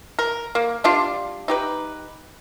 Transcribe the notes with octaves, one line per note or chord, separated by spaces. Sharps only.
A#4
A#3
G3 D4 F4
D#4 G4 B4